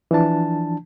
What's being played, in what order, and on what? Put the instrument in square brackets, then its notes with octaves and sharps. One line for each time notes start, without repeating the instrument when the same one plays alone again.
[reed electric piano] E3 F3 D4 A5